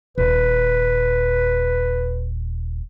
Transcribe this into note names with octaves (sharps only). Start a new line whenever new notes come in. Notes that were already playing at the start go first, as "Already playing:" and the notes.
D#1 B4